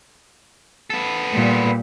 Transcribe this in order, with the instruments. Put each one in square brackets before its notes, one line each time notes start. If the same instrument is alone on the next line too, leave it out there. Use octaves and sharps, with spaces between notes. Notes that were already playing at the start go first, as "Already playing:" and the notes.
[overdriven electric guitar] B3 A4
[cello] A#2 G3